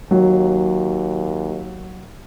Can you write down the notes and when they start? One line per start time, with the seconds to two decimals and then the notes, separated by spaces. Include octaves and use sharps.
0.11 D#2 F#3